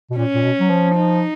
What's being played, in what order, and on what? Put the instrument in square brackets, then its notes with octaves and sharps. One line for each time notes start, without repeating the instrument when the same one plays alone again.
[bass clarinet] B2
[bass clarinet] A#2 [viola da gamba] C#4
[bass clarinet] A#2
B2
F#3
F3
[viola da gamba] D#4